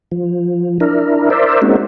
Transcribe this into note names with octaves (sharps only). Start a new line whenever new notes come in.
F3
D4 E4 A#4
A#4 C5 D5 E5
G#3 A#3 C4 C#4 D#4 F#4